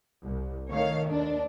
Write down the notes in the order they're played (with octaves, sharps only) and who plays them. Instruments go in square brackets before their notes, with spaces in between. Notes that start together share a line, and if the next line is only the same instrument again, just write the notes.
[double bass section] C2
[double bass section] D#3 A3 [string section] C#5 F5
[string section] D#2 D4